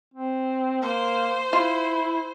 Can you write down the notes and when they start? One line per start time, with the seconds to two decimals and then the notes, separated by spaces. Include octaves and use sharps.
0.14 C4
0.82 A#3 C5
1.53 E4 F4